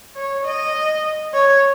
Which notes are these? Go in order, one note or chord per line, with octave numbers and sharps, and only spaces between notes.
C#5
D#5
C#5